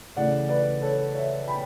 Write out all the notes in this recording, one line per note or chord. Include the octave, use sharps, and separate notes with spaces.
C#3 E3 A3 D5 F#5
B4 D5
A4 C#5
C#5 E5
G5 B5